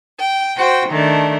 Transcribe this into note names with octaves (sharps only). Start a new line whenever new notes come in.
G5
F#4 C5 G5
D#3 A3 D4